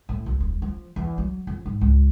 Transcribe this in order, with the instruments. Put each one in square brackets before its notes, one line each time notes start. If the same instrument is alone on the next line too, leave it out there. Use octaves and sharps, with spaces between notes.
[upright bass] A2
B1
D#1
F3
E2
F#3
F2
G#2
C#2